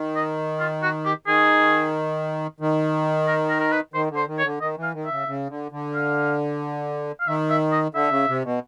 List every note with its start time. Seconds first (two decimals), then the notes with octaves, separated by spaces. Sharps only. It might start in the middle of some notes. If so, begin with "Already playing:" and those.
Already playing: D#3
0.16 D#5
0.60 F4
0.83 F#4
1.05 G4
1.27 D#3 G#4
2.60 D#3
3.27 A#4
3.49 A#4
3.60 A#4
3.72 B4
3.94 D#3 C5
4.11 D3
4.16 C5
4.28 D#3
4.38 C#5
4.44 D3
4.61 D#3 D#5
4.77 E3
4.83 F5
4.94 D#3
5.05 E5
5.11 C#3
5.28 C#3
5.50 D3
5.72 D3
5.94 F5
7.20 F5
7.28 D#3 E5
7.50 E5
7.72 D#5
7.95 D3 E5
8.11 C#3
8.28 C3
8.44 B2